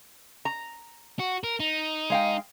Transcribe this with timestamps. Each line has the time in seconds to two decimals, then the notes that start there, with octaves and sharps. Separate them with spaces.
0.45 A#5
1.19 F#4
1.44 A#4
1.60 D#4
2.10 G#3 F5 G5